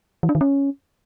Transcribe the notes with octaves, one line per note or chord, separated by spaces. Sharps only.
E3
D4
D#3
C#4